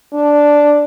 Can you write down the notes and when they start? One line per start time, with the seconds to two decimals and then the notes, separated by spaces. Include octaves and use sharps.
0.13 D4